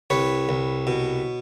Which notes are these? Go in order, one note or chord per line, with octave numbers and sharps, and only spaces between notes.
C2 B4 C#5
C2
B2